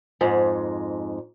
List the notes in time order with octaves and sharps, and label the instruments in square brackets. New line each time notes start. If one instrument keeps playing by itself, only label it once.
[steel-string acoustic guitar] F2 G#2